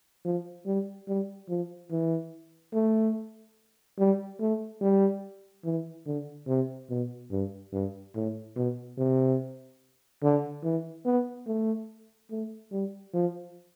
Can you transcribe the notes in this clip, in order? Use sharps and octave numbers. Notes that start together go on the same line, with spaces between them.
F3
G3
G3
F3
E3
A3
G3
A3
G3
E3
D3
C3
B2
G2
G2
A2
B2
C3
D3
E3
B3
A3
A3
G3
F3